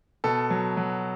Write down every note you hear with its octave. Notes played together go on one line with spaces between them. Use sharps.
B2 A4
F#3
F#3